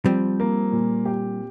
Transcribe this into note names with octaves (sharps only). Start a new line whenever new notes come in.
F3 G3 C4
A#3
A#2
G4